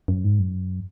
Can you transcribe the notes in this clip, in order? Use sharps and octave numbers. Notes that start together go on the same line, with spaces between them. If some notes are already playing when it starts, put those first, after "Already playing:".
F#2
G#2
F#2